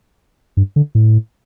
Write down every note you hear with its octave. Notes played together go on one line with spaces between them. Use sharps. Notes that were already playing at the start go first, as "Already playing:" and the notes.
G2
D3
A2